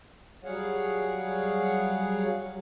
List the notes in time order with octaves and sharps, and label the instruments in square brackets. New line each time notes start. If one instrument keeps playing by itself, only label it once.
[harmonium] F#3 G3 G#4 C#5 F5 F#5